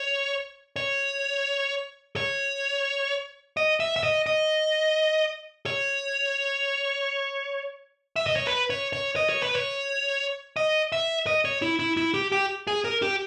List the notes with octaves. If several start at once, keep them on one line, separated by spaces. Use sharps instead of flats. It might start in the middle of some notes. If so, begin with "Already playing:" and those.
Already playing: C#5
C#5
C#5
D#5
E5
E5
D#5
D#5
C#5
E5
D#5
C#5
B4
C#5
C#5
D#5
C#5
B4
C#5
D#5
E5
D#5
C#5
E4
E4
E4
G4
G4
G#4
A#4
G4